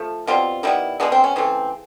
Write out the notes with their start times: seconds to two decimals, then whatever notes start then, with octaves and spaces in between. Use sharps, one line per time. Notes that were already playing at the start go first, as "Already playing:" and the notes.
Already playing: F3 A3
0.27 B2 G3 C4 F4
0.63 D#3 G3 B3 E4
1.00 B2 G#3 B3 D4
1.12 C4
1.24 C#4
1.36 C#3 E3 A3 C4